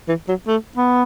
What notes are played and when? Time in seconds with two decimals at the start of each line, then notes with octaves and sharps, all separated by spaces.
0.08 E3
0.28 F#3
0.47 A3
0.77 B3